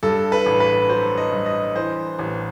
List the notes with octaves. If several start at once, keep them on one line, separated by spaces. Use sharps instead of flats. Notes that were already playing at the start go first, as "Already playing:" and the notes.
G2 A4
B4
A1
B4
F#3 C5
D#5
G2
D#5
E3 C5
A1